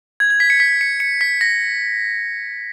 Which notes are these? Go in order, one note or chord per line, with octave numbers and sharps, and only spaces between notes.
G#6
G#6
B6
C#7
B6
C#7
C#7
B6
A#6